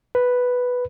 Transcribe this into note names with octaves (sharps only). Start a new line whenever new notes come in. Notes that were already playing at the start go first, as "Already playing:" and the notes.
B4